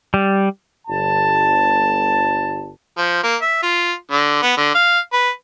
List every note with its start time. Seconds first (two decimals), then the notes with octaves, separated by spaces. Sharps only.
0.14 G3
0.88 G1 A5
2.98 F3
3.23 A#3
3.42 E5
3.63 F4
4.11 D3
4.42 B3
4.57 D3
4.75 F5
5.13 B4